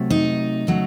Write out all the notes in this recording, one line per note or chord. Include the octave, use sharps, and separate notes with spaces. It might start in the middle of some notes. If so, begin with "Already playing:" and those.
Already playing: C3 F#3 A3
D#4
C#3 F#3 A3